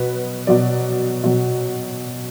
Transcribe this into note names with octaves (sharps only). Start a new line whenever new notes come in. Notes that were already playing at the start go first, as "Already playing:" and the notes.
Already playing: B2 F#3 B4
B2 F#3 D5
B2 F#3